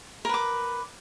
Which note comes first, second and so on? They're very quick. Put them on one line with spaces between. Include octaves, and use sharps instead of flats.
A#4 B4 D6